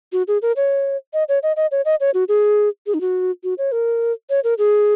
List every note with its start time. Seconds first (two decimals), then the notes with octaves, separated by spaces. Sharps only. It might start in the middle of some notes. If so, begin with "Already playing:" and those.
0.13 F#4
0.28 G#4
0.42 A#4
0.56 C#5
1.14 D#5
1.29 C#5
1.43 D#5
1.57 D#5
1.71 C#5
1.85 D#5
2.00 C#5
2.14 F#4
2.28 G#4
2.87 G#4
2.94 D#4
3.01 F#4
3.44 F#4
3.58 C#5
3.72 A#4
4.30 C#5
4.44 A#4
4.58 G#4